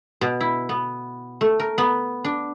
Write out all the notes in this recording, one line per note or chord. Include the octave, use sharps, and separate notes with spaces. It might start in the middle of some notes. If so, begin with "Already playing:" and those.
B2
E4
B3
A3
A#4
B3
D4